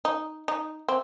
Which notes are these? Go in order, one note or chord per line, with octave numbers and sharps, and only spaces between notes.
D#4
D#4
C4